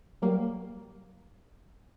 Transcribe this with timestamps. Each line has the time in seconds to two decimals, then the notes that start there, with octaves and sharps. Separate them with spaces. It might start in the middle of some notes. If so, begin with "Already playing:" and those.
0.22 F#3 G3 A#3